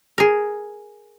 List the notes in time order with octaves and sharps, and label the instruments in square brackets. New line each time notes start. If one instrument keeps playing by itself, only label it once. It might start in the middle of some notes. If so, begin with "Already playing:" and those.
[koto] G#4 A#4